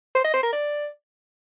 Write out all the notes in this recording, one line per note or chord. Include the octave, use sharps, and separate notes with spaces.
C5
D#5
C5
A#4
D5